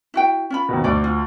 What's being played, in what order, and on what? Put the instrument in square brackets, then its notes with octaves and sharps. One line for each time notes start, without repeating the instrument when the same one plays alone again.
[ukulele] E4 F#4 G5
C#4 F4 B5
[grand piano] D#2 B2
[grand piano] D2 [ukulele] F#4 D5
[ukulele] F4